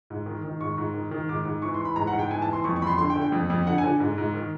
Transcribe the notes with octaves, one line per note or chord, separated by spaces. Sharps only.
G#2
D#3
D#3
G#2 C#6
G#2
D#3
D#3
G#2 D6
G#2
E3 C#6
C6
E3
B5
G#2 A#5
F#5
G#2
G5
E3 G#5
A5
E3
C6
F2 C#6
C#6
F2 B5 C6
D3 C6
G5
D3
G5
F2
F2
D3 F#5
G#5
D3
G#2
G#2
D#3